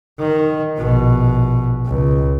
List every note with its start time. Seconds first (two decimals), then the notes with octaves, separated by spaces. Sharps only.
0.19 D#3
0.78 A#1 B2
1.86 C#2